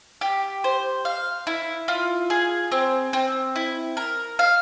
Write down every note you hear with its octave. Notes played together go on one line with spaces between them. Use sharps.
G4
C5
F5
E4
F4
G#4
C4
C4
E4
A#4
F5